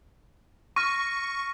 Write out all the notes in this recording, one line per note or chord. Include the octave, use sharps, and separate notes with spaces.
C#6 F6 A#6 D#7